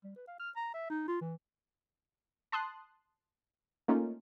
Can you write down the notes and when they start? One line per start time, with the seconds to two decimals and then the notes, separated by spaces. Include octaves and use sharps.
0.04 G3
0.16 B4
0.28 F5
0.40 F6
0.56 A#5
0.74 E5
0.90 D#4
1.08 F4
1.21 E3
2.52 A5 C6 D#6 F#6
3.88 A3 A#3 C#4 D#4 F4